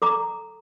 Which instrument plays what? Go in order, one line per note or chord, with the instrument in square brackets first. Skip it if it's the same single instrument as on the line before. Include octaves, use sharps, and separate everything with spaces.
[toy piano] A4 A#5 D6